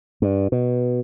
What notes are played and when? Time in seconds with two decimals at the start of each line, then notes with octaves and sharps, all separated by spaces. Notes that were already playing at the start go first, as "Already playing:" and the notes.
0.22 G2
0.52 B2